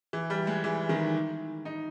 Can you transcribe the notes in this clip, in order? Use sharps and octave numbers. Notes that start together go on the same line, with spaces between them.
E3
G3
G#3
E3
D#3
D#4